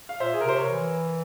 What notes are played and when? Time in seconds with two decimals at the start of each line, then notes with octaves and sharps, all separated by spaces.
0.09 F5
0.20 A#2 C5 E5
0.33 G#4
0.41 A#4
0.44 C3 C5
0.56 A#4 C#5
0.68 E3